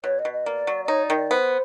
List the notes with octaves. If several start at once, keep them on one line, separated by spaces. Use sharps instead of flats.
B2 C#5
D#5
B2
D#5
A#3 D5
F#3
D5
D#4 C#5
D5
D#3
D5
B3 C5